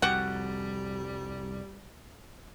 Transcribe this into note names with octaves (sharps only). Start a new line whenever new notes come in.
C2 F2 G3 F#4 G4 F#5